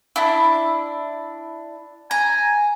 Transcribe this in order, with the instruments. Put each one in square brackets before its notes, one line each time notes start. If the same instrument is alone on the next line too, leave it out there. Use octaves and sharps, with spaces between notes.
[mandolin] D4 E4
[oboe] G#5 [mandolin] A#5